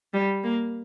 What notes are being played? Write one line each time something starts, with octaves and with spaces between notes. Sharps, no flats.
G3
A#3